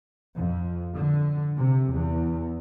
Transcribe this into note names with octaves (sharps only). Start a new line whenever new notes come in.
F2
D3
C3
E2